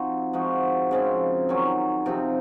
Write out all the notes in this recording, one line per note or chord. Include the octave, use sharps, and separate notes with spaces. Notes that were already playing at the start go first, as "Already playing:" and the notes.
Already playing: F3 C4 D#4 F#4
F3 G#3 D#4 F#4
C#3 F3 G#3 C4
D#3 F#3 C#4
C3 F3 C4 D#4